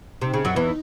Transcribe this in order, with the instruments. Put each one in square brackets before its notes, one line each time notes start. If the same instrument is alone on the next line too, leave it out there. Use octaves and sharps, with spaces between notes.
[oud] C3 [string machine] D#4
[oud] C#3
F#2 F#3
E2 E3